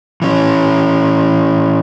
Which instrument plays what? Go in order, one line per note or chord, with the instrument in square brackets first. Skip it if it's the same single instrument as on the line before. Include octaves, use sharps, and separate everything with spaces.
[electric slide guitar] E3 C#4